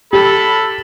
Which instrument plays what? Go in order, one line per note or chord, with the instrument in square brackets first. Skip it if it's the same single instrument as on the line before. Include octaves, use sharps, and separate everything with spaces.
[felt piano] G4 [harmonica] A4 B5